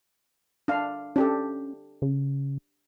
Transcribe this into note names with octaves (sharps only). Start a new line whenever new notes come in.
D4 F5
C#4 D4 G4 A4
C#3